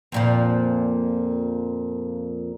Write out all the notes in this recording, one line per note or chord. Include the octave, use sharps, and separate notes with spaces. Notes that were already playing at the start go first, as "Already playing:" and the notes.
F2 A#2 F3